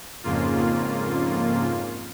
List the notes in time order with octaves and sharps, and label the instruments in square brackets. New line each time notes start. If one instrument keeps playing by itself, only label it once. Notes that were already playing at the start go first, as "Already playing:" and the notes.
[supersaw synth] F2 G#2 C#3 A#3 F4